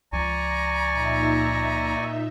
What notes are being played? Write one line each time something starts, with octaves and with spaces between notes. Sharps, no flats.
C#2 F3 D5 G#5 A#5 C#6
A#2 D#4 E5